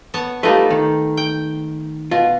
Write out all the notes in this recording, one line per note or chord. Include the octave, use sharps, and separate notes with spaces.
B3 C#5 A5
G3 A3 D#4 F4 B4
D#3
G5
B2 F4